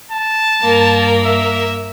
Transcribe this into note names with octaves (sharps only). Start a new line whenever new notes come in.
A5
G2 A#3 A#4
E5